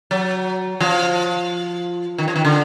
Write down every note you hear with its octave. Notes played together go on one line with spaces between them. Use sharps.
F#3
F3
D#3
F3
D#3
D3